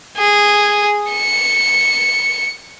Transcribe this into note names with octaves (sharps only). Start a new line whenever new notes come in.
G#4
C#7